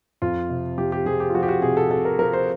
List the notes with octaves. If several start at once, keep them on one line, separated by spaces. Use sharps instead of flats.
F2 F4
C3
F3 G4
G4
F3 G#4
G4
F4
F3 F#4
G4
F#4
C3 G#4
A4
C3 A4
A#4
F3 A#4
C5